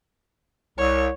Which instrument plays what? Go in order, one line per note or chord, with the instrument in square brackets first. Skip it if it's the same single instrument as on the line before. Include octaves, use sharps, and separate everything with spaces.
[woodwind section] C2 [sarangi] C#5